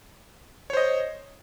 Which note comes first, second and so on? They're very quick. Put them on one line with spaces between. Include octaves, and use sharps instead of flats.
C#5 C5 D#5